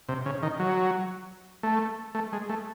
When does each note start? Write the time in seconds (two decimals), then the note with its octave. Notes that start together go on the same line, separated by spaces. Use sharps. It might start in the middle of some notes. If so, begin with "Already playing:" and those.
0.09 C3
0.26 C#3
0.43 D#3
0.60 F#3
1.63 A3
2.15 A3
2.33 G#3
2.49 A3